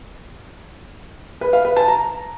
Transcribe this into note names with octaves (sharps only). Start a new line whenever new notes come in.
B4
F5
B4
A5
A#5